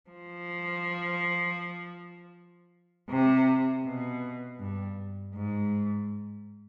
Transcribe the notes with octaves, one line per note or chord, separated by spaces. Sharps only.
F3
C3
B2
G2
G#2